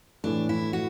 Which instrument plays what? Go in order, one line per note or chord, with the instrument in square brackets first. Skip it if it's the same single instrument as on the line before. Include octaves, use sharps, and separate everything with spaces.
[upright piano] A2 E3 A3 [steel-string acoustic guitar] D4
[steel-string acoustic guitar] E4
F#4